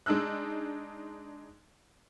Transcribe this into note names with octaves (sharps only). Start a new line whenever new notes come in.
G#3 D4 D#4 E6 F#6